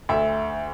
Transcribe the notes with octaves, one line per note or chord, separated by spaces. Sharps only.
D2 E5